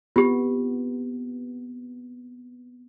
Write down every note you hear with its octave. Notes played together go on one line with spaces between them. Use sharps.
B3 C4 F4 G4